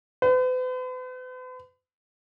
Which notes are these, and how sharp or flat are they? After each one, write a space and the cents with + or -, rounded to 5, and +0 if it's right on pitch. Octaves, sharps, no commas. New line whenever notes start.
B4 +45